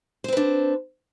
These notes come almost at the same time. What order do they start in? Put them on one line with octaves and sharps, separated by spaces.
C5 C4 B4 D4